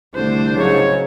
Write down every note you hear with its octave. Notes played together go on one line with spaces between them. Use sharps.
C2 D3 A3 D4 C5
G#2 C#3 F#3 C#5